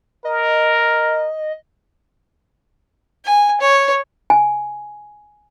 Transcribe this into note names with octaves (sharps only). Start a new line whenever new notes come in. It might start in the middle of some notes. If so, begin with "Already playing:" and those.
A#4 D#5
G#5
C#5
G#5